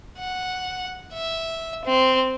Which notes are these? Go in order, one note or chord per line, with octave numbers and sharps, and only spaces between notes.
F#5
E5
C4